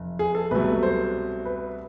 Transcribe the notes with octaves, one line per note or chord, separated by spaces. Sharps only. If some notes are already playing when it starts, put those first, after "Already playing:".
Already playing: F1
G#4
A4
C2 B2 F#3 A3 B4
C5
B4